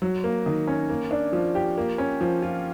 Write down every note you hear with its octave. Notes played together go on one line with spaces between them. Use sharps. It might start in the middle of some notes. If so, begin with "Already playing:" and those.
F#3
A#3
D#3
C#4
A#3
D4
F3
G4
A#3
C#4
F3
F4